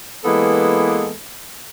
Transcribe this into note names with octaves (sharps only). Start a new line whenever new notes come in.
E3 G#3 A#3 B3 A4